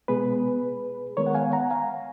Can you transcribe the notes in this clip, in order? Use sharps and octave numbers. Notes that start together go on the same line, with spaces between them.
B2 G#3 B3 G#4 B4
D#3 G#3 B3 A#4 C#5
F#5
F5 G#5
F#5 A#5
F5 G#5